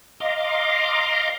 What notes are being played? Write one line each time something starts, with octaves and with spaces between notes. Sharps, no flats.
D#5 F5 A#5 C6 D6